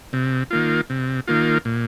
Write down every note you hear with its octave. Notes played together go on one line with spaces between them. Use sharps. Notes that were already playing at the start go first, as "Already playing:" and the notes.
C3
D#3 A#3 F4
C3
D#3 A#3 F4
A#2